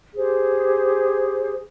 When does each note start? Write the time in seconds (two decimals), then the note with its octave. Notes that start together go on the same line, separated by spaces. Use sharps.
0.16 G4 G#4 C5